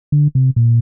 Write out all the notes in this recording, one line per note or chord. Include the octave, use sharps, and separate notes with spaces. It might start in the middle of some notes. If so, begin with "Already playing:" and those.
D3
C3
A#2